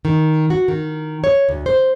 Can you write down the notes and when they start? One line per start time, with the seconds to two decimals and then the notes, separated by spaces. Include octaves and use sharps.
0.05 D#3
0.50 F#4
0.68 D#3
1.24 C#5
1.49 D2
1.66 C5